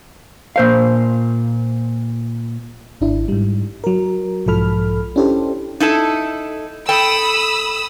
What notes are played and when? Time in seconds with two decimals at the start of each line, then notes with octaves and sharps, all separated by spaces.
0.56 A#2 C5 F5
3.01 G#1 D4 E4
3.28 G#2 G3
3.84 F#3 A#4
4.46 B1 G#2 F3 A4 B5 F6
5.16 C#4 D4 E4 G4 A4 C5
5.80 D#4 E4 A4
6.89 A4 G5 B5 D#6 E6